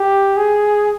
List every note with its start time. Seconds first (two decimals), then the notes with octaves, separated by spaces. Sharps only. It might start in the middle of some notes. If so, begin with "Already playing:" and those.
Already playing: G4
0.37 G#4